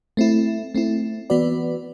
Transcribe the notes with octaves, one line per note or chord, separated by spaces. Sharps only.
A3 C4 E4
A3 C4 E4
E3 B3 F#4 B4 D5